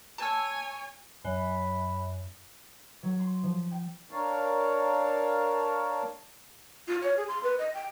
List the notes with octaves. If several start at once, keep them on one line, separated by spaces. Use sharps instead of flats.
C#5 G#5 A5 E6
F#2 B5
F#3
C6
F3
G5
D4 A#4 C#5 F5 A5
F4
C#5
G#4
C6
B4
D#5
G5